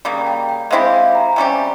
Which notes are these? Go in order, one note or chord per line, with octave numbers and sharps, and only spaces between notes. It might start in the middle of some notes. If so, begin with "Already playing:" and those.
C#3 G3 A#3 G5
G5
G5
G#3 C4 E4 G4 F5
G5
A#5
G5
C3 G3 C#4 G4 G#5